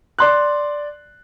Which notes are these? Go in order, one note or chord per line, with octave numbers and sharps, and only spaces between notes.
D5 C6 F#6